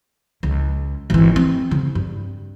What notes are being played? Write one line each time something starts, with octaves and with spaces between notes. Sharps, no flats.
C#2
G#1 E3
C4
C#3
G2